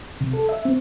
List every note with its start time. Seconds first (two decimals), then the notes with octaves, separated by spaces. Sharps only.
0.21 C3
0.33 A4
0.49 E5
0.65 C4